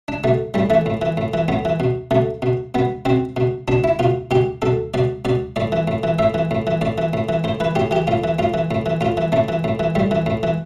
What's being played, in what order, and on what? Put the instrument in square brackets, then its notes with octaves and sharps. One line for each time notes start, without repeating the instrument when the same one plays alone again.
[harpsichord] D4
B2 A3
A2 G3
E3 A3
A2
E3
A2
E3
A2 B3
E3
B2
B2 A3
B2
B2 B3
B2 C4
B2
B2 D4
E4
B2 F4
B2 G4
B2 A4
B2 D5
B2 D5
A2 D5
E3
A2
E3
A2 E5
E3
A2
E3
A2 D5
E3
A2
E3
A2 C5
E3 B4
A2 G4
E3 G4
A2 F4
E3
A2 F4
E3
A2
E3
A2 F4
E3
A2 A3
E3
A2
E3
A2 G3
E3
A2
E3